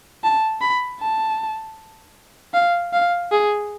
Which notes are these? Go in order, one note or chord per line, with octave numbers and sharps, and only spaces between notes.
A5
B5
A5
F5
F5
G#4